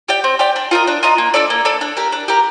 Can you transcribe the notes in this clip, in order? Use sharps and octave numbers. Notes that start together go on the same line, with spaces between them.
G4 D5 G5
C4
G4 D5 G5
D4
F4 A#4 D#5
D4
F4 A#4 D#5
A#3
D4 A4 D5
A#3
D4 A4 D5
D4
G4 A#4
D4
G4 A#4